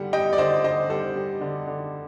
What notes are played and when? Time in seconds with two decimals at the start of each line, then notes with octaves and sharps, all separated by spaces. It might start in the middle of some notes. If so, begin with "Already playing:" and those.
Already playing: D3 G3 F#5
0.13 G3 D#5 G5
0.33 D5
0.38 D3 C5 D#5
0.64 D3 C5 D#5
0.89 G3 A4 C5
1.15 G3
1.41 D3
1.68 D3